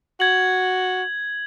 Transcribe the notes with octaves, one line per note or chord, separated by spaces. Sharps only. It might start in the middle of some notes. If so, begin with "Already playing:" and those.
F#4 G#6 F#7